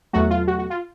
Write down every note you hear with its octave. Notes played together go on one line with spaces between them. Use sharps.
E2 B2 F#3 A3 F#4
F4
F#4
F#4
F4